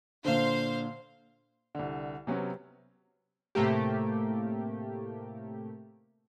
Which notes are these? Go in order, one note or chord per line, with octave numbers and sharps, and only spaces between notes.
A#2 D3 C5 F5
C2 D3
C3 F#3 B3 C#4
A2 C3 A3 A#3 G4